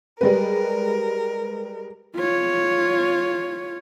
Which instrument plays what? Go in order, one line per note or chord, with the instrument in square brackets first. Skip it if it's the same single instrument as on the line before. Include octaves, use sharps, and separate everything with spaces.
[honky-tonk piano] G3 G#3 B4 [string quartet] A#4
[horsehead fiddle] F4 C#5